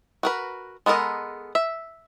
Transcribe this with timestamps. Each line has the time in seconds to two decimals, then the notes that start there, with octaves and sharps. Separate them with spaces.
0.23 F#4 A#4 B4
0.86 G#3 B3 A4 A#4 D#5
1.55 E5